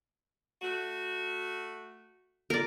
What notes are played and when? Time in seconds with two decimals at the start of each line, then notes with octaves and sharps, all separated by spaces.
0.61 A3 F#4
2.50 A#4 D5